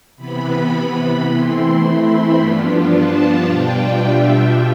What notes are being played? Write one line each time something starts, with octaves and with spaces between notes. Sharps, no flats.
C3 E3 B3 B5
B5
E3 A3 C4 E4 C6
B5
G2 F3 B3 D4 F4
A5
B2 G3 D4 F4 G5
E5